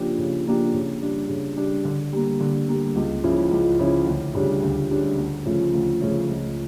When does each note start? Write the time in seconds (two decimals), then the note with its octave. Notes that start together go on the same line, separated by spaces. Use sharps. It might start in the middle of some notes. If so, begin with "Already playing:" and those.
Already playing: C#3 F3 A#3 D4 G4
0.18 C#3
0.46 F3 A#3 D4 G4
0.73 C#3
1.02 G3 D4
1.29 C#3
1.57 G3 D4
1.85 D3
2.13 G3 A#3
2.40 D3
2.68 G3 A#3
2.96 C#2
3.24 C#3 F3 C#4 E4
3.51 C#2
3.79 C#3 F3 C#4 E4
4.06 D2
4.35 C#3 G3 D4
4.63 D2
4.90 C#3 G3 D4
5.18 D2
5.45 C#3 F3 A3 C#4
5.73 D2
6.02 C#3 F3 A3 C#4
6.30 C#2